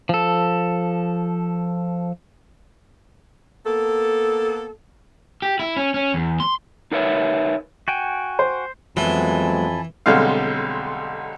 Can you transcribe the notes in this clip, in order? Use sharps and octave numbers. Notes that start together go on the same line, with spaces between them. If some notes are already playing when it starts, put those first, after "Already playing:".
F3 A4
A#3 B3 A4
G4
E4
C#4
C#4
E2
C6
D#4 A#4 B4 C#5 E5
F#4 G5 G#5
C5
F2 E3 F#3 G#3 B3 G#5 A5 B5
B1 D3 G3 G#3 C4 F5